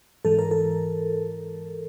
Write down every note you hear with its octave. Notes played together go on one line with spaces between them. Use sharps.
G#2 E3 A4
A#4
A4